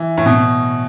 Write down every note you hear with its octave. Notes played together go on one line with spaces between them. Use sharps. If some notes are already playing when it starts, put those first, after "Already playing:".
Already playing: E3
A2
B2